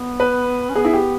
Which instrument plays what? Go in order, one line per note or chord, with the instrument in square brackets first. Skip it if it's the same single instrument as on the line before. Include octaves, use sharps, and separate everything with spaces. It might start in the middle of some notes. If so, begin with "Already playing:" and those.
Already playing: [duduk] B3
[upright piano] B4
[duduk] C#4
[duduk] B3 [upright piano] G#4
[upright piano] E4
G4